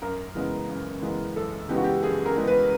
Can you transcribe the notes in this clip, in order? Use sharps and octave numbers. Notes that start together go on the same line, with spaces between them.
F#2 A#4
C#3 E3 G#3 B3
F#2
C#3 E3 G#3 B3
F#2 A4
C#3 E3 G#3 B3 G4
F#4
G4
F#2 G#4
A#4
C#3 E3 G#3 B3
B4